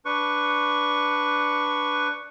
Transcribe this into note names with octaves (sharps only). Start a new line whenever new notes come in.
D4 B4 C#6